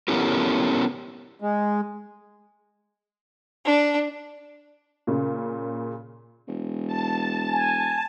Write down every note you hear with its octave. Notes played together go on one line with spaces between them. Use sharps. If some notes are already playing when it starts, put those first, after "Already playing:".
B3 C#4 E4 G4 A4 A#4
G#3
D4
A#2 C#3
E1
A5
G#5